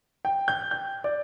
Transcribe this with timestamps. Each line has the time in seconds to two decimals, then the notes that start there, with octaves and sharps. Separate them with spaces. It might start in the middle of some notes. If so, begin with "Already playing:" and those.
0.25 G5
0.48 G6
0.71 G6
1.04 D5